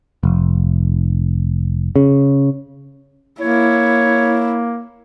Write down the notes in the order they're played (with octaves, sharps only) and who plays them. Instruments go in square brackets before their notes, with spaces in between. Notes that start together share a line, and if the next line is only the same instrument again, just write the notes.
[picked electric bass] F1
C#3
[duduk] A#3 [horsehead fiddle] E4 [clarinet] C#5